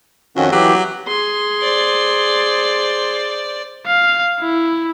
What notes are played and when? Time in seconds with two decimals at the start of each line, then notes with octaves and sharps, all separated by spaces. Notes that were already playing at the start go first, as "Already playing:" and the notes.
0.36 F2 D#3 C#4 F#4
0.52 E3 F#3 G4
1.08 G#4 C6
1.62 C5 D5
3.86 F5
4.40 E4